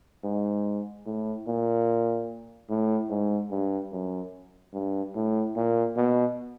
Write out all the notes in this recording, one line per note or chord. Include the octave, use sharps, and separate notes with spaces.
G#2
A2
A#2
A2
G#2
G2
F#2
G2
A2
A#2
B2